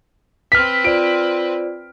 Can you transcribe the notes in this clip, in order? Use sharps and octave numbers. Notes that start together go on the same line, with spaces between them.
C4 B4 F6 B6
F4 C5 D5 D7